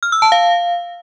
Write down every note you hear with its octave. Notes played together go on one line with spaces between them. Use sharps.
F6
E6
A5
F5